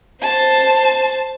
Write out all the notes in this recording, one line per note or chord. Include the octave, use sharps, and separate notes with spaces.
C5 A5